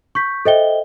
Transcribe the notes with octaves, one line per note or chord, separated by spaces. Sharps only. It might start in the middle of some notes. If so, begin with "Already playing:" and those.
C#6 G6 B6
A4 C5 D#5 E5 G5 G7